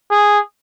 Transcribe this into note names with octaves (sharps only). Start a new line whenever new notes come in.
G#4